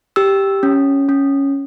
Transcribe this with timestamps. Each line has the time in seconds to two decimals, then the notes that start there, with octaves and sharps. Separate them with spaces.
0.16 G4 E6
0.63 C#4
1.09 C#4